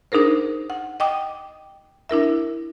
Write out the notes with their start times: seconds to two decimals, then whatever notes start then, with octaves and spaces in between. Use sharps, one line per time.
0.12 D4 D#4 G#4 A#4 C5
0.70 F#5
1.00 D#5 G5 D6 D#6
2.09 D4 E4 A#4 E5